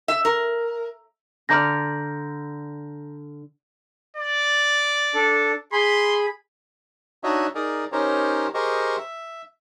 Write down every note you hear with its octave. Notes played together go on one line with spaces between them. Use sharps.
E5
A#4
D3 D5 A#5 F6 G6 A#6
D5
D4 A4
G#4 B5 C6
D4 D#4 F#4 C#5 D#5 E5
D#4 G#4 A#4 D5
C#4 D#4 G4 A#4 C5 C#5
G4 G#4 A#4 C5 D#5 C#6
E5